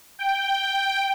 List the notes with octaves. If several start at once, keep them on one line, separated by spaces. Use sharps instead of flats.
G5